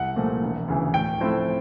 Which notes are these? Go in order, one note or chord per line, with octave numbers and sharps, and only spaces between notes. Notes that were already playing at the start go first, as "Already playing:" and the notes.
Already playing: C2 F#5
A#2 F3 A3
E1
D2 C#3 E3
A2 G5
F3 A3 C4 E4